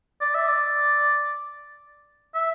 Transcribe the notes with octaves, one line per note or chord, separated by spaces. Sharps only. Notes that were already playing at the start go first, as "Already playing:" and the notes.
D5
E5
D5
E5